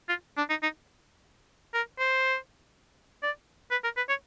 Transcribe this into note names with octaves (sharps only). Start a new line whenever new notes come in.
F4
D4
D#4
D#4
A#4
C5
D5
B4
A#4
B4
C#5